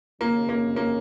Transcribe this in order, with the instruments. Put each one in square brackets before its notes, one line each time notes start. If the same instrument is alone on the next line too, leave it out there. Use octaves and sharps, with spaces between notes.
[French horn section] D#2 C#3 F#3 C#4 [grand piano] A#3
[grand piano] A#3
A#3